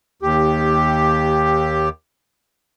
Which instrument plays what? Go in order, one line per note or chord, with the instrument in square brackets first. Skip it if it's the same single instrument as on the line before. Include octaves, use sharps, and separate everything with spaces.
[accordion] D#2 G4